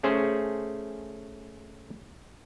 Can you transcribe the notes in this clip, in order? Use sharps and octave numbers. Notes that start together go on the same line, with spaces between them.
A3 C#4 G#4 C5